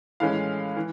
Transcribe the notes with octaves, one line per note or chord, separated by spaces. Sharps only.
A2 E3 G#3 C#4 F5
E3